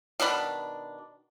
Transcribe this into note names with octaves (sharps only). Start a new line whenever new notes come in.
B2 D#3 D4 B5